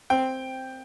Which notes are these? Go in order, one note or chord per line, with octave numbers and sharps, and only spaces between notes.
C4 G5